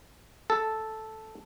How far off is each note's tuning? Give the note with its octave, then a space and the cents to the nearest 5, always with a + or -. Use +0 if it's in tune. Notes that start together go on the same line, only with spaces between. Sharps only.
A4 -5